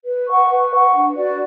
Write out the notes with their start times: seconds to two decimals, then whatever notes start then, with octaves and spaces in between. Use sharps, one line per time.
0.05 B4
0.27 F#5 C#6
0.49 B4
0.70 F#5 C#6
0.93 D4
1.15 F#4 B4 D5